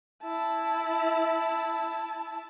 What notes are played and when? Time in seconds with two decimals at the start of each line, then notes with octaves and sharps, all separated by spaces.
0.23 E4 A5